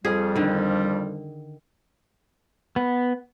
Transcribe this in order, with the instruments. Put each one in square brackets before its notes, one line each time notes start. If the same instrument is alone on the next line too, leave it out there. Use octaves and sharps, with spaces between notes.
[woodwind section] F2 G3 [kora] G#4
[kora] D3 D#3
[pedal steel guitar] B3